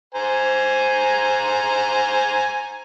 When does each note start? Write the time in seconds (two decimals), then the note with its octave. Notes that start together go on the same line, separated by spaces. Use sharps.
0.15 C5 G#5 A#5